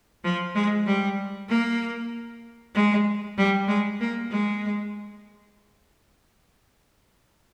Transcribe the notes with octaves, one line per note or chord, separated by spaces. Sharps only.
F3
G#3
G3
A#3
G#3
G3
G#3
A#3
G#3